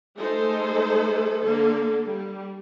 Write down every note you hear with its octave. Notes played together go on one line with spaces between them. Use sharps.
G#3 A3 D#4 A4 C5
D3 A#3 A4
G3